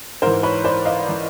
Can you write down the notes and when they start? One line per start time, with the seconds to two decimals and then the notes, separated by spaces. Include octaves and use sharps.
0.22 G#2 E3 A#4 C5
0.43 B4 C#5
0.64 C5 D5
0.85 D#5 F5
1.09 E3